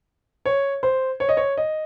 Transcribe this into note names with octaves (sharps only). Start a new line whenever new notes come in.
C#5
C5
C#5
D#5
C#5
D#5